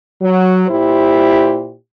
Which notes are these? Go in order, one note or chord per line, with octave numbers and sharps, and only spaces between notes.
F#3
A#2 E4 G4 C5